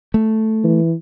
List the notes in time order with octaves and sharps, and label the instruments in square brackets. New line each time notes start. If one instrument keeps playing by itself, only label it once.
[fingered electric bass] A3
[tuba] E3